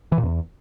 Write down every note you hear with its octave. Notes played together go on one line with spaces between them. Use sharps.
E3
A#2
E2